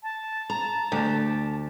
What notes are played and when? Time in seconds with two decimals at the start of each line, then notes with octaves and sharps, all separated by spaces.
0.03 A5
0.50 A#5
0.92 D2 G4